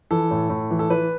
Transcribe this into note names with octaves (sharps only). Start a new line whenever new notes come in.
E3 A4
A2
A2
E3
A4
E3 B4